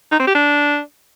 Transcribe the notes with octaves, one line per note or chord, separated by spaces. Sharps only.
D#4
C4
G4
D4